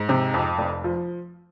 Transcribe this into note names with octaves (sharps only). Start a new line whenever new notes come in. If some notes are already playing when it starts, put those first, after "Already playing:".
Already playing: G#2
C3
F2
F1
F3